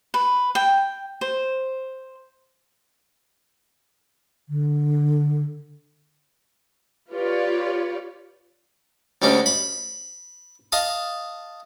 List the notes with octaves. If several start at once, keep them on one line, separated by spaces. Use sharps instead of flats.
B4
G5
C5
D3
F4 G4 B4 C#5 D5
D2 G3 G#3 C#4 D4
B5
D#5 F5 A5 D#6